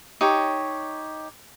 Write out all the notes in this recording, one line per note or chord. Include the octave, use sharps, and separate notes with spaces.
D#4 G4 C#5